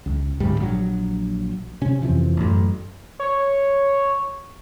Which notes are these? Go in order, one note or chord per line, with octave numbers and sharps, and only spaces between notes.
C#2
D1 G#2 G3
A#1 F#3
C3 C#4
F2 C3 E3 F3
A1 F#2
C#5